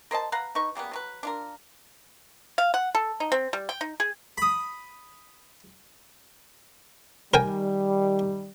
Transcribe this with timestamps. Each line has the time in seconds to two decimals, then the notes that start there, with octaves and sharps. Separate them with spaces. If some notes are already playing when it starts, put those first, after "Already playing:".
0.11 A#4 C5 D#5 A5
0.32 B4 F5 F#5 A#5
0.55 D#4 B4 C#6
0.75 C#3 G3 A#3 B3
0.91 F#3 F4 B4
1.23 D4 F4 A#4
2.58 F5
2.74 F#5
2.95 A4
3.20 D#4
3.32 C4
3.53 G3
3.69 G5
3.81 D#4
4.00 G#4
4.38 B5 D#6
7.34 D#3 G3 A#4 G5 G#5